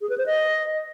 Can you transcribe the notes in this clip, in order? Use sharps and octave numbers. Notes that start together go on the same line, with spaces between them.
G#4
B4
C5
D#5